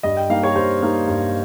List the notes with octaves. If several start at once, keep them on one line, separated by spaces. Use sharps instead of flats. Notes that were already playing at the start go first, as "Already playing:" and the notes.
G2 D#5
G5
G3 A#3 D#4 F5
C#5
G2 C5
G3 A#3 D#4
G2